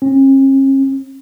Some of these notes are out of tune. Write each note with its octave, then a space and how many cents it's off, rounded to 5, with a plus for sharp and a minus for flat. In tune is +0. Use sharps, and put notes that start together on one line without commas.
C#4 -45